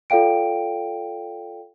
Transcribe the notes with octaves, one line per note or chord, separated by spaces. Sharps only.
F4 A4 D5 F5 G5 D7